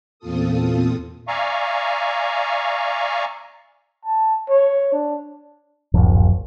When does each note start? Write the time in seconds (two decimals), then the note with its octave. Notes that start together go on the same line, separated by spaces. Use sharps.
0.19 E2 A#2 C4 F4 A4 D#6
1.28 D5 E5 F5 G#5 A#5 C#6
4.05 A5
4.49 C#5
4.92 D4
5.94 D1 A#1 F#2 F3